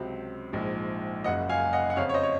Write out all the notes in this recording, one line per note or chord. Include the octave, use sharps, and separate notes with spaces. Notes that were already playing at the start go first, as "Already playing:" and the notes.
Already playing: C#2 C3 F#3 C4
A#1 G#2 F3 G#3
F#1 F#2 C#3 D#5 F#5
F5 G#5
D#5 F#5
F#5
F2 C#3 F3 C#5 F5
C#5
C5 D#5
C#5